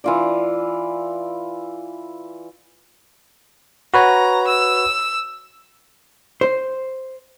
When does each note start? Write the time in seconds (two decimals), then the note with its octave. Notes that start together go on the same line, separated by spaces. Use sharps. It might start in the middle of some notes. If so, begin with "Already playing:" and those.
0.04 E3 F4 D5
3.94 F#4 B4 C#5 A#5
4.48 E6
6.41 C5